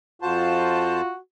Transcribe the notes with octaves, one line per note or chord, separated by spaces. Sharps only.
F2 F4 F#4 C5 A5